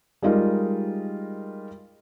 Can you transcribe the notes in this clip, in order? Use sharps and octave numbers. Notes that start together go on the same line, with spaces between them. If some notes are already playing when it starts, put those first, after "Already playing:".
G3 G#3 D#4 F4 A#4